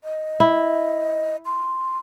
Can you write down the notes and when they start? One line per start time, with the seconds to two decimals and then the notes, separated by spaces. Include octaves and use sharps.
0.04 D#5
0.40 E4
1.46 C6